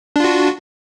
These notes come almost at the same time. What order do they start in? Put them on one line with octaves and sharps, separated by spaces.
D4 F4 F#4